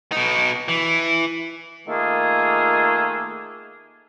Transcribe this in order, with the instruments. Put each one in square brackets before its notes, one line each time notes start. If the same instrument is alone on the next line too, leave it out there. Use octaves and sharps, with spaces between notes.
[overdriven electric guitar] B2 D#4
E3
[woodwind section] D#3 A3 A#3 F4 G#4